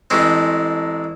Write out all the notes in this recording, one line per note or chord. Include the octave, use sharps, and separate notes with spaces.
A1 A2 G#3 C4